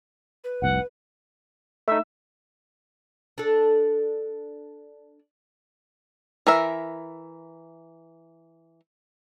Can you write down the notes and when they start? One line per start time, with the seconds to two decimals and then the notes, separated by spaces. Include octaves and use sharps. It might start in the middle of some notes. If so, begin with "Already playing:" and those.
0.44 B4
0.62 F1 C2 F#5
1.88 A3 D#4 E5
3.38 D4 A4
6.47 E3 A#4 E5